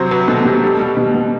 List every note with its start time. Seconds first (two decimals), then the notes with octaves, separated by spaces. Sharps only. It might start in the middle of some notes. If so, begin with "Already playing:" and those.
Already playing: C3 F#3 C5
0.11 F#3 B4
0.28 B2 A4
0.45 B2 G4
0.63 G3 A4
0.80 G3
0.97 B2
1.15 B2